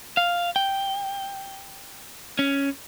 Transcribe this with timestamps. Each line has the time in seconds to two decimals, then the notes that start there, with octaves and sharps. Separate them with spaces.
0.17 F5
0.56 G5
2.39 C#4